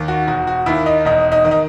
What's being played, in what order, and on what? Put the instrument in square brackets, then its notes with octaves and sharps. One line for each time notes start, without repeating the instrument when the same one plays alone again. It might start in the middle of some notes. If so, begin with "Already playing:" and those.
Already playing: [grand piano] D#2 D#3
F#4
E1 F#4
F#4
D#2 D#3 E4
D#4
E1 D#4
D#4
D#3
D#4